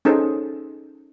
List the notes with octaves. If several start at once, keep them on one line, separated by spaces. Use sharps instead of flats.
C#4 D#4 G#4 A4 C5